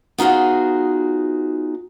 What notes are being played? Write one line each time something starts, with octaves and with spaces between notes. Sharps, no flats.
B3 D#4 F4 F#4 G#4